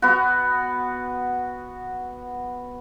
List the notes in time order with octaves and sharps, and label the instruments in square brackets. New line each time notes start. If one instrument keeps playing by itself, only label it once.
[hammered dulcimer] B3 F#4